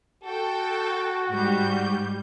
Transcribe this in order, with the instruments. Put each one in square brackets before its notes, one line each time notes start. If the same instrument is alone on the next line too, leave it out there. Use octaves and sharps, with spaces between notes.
[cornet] F#4 [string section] A4 G5
[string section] G#2 G3 G6